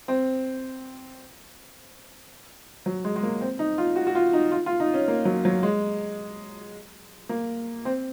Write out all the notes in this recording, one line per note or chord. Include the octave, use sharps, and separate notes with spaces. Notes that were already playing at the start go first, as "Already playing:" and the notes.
C4
F#3
G#3
G#3
A#3
C4
D#4
F4
F#4
F#4
F4
D#4
F4
F4
D#4
C#4
A#3
F#3
F#3
G#3
A#3
C4